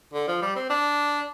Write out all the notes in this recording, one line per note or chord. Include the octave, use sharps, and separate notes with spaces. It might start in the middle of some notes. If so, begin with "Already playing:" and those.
D3
F3
G3
C4
D4